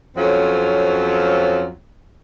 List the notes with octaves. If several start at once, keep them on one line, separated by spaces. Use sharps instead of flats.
F2 F#3 C4 C#4 F4